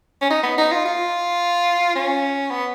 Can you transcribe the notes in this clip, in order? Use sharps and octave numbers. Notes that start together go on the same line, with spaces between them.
C#4
D#4
B3
D#4
F4
F4
C#4
B3